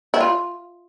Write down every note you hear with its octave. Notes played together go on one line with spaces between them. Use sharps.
E4
F4